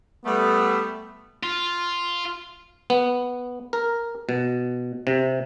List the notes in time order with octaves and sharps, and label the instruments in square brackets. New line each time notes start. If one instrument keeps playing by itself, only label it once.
[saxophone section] G3 A3 [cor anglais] B3
[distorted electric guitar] F4
[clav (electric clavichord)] B3
A#4
B2
C3